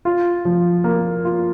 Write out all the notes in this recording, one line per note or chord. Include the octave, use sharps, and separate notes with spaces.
F4
F3
A#3
F4